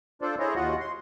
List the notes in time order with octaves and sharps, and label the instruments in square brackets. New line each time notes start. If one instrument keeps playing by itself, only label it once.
[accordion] D4 F4 A4 C5 D5
E4 G#4 C5 C#5 D#5
D#2 F4 F#4 D#5 F#5
C6